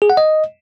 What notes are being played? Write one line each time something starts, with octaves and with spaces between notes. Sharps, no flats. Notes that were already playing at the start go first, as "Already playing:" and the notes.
G#4
F#5
D#5